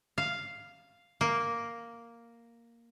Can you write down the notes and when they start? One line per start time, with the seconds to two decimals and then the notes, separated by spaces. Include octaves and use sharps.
0.18 F5
1.21 A#3